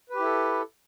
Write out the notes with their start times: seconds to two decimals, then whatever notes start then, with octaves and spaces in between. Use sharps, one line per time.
0.10 B4
0.14 G4
0.19 E4
0.24 A4